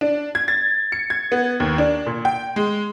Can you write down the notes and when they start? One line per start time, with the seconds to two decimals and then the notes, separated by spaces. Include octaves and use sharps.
0.01 D4
0.35 G#6
0.48 A6
0.92 C#7
1.10 G#6
1.32 B3
1.60 D#2
1.78 D4
2.06 A#2
2.25 G5
2.56 G#3